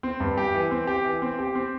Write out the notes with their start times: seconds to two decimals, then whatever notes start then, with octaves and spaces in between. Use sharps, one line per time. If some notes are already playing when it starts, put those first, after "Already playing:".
0.03 C4
0.20 G2
0.38 G4
0.54 E3
0.71 C4
0.87 G4
1.05 E3
1.22 C4
1.39 G4
1.55 C4